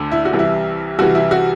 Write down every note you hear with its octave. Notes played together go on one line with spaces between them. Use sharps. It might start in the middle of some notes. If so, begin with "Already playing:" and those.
Already playing: D2 D3
E4
F#4
C2 C3 E3
E4
C2 C3 E3 F#4
E4
F#4